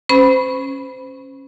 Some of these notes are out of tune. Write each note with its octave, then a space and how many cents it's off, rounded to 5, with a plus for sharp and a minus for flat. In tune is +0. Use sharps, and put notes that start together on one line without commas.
C#4 -15 C5 -30 B5 +0